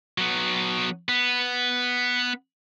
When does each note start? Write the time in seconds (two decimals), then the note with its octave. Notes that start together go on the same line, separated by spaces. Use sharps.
0.18 F#3 B3
1.09 B3